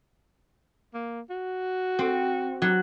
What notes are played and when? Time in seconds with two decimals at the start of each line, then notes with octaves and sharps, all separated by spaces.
0.94 A#3
1.30 F#4
1.99 C4
2.62 F#3